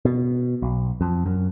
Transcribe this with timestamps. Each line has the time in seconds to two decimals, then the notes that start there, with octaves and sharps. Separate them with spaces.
0.05 B2
0.62 B1
1.01 F2
1.26 F#2